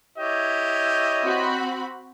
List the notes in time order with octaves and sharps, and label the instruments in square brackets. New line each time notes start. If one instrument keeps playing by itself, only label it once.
[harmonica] E4 G4 C#5 [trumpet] D#5
[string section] C4 F#4 B5